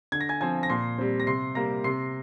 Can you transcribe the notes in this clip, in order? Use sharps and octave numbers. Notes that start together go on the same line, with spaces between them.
D3 G#6
A#6
G#5 G#6
F3 C4 G#5 G#6
A#6
A#2 C6 C7
G3 C4
A#6
C3 C6 C7
G3 A#3 A#5 A#6
C3 C6 C7